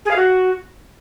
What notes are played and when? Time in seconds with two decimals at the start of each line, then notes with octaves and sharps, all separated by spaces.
0.05 G#4
0.10 F5
0.16 F#4